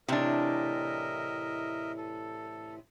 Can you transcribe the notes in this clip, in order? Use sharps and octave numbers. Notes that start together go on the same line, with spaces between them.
A2 C3 E3 D4 A#4 D#5 E5
A4